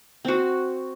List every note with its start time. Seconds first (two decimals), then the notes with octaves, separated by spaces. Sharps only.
0.25 C4 F#4